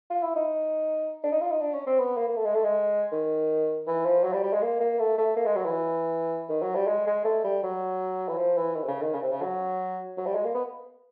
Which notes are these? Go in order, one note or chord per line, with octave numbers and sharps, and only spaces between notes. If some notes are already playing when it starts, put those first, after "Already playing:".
F4
E4
D#4
D4
D#4
F4
D#4
D4
C#4
C4
B3
A#3
A#3
A3
G#3
A3
G#3
D#3
E3
F3
F#3
G3
G3
G#3
A#3
A#3
A3
A3
A#3
G#3
F#3
E3
D#3
F#3
G3
G#3
G#3
A3
G3
F#3
E3
F3
E3
D#3
C3
C#3
D#3
C#3
C3
C#3
F#3
F#3
G3
G#3
A#3
B3